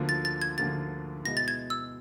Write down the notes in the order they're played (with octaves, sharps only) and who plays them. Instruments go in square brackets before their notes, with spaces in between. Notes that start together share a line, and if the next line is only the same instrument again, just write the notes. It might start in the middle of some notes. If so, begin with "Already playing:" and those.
Already playing: [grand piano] D2 D3 F3 A#3
[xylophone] A6
A6
G#6
[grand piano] D2 D3 F3 A#3 [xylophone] A6
[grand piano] B2 G#3 B3 E4 [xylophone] A#6
[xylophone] A6
G#6
E6